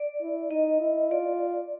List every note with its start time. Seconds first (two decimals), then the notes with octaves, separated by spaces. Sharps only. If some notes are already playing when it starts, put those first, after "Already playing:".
Already playing: D5
0.21 E4
0.50 D#4 D#5
0.80 E4
1.11 F4 D5